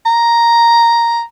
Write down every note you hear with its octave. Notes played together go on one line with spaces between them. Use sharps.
A#5